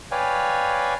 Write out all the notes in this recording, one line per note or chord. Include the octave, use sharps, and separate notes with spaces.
B4 C#5 D5 F5 G5 G#5